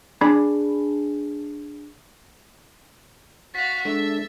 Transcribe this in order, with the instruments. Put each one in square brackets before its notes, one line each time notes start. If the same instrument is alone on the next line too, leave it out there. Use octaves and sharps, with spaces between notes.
[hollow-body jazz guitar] D4 G#4 B5
[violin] F#4 F5 [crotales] A6 B6
[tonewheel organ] G#3 D4 A4 [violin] E5